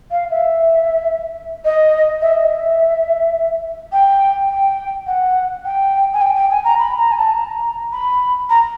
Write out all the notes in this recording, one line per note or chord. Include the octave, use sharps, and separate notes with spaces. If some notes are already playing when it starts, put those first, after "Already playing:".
F5
E5
D#5
E5
D#5
E5
G5
G5
F#5
G5
G#5
G5
G5
G#5
A#5
B5
A#5
G#5
A5
A#5
B5
A#5